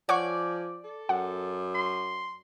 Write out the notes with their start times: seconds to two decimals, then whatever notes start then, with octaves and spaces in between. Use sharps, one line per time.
0.09 F3 C#5 D5 F#5 G#5 C#6
0.84 A4
1.09 F#2 F#5
1.75 C6